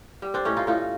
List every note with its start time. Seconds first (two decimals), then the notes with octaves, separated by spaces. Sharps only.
0.22 G3
0.34 C4 D4
0.45 A2 C#4 D#4
0.57 D#4 F4
0.67 A2 D#4 F4